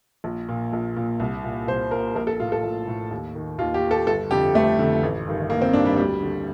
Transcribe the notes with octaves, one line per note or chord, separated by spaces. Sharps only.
A#1
A#2
A#1
A#2
C2
A#2
C2 C5
A#2 A#4
A#1 A#4
A4
A2 F4
A4
A#1
A2
D#2
D#3
D#2 F4
G4
D#3
A4
G1 A4
F2 D3 G4
G1 A3
F2 D3
A1
G2 D#3
A1 A#3
C4
G2 D#3 D4
G3
D2 G3
D3